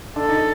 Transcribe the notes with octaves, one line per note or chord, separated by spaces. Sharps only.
D4 A4
D#4